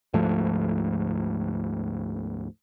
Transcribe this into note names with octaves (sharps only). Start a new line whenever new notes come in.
D2 G#2 F3 A3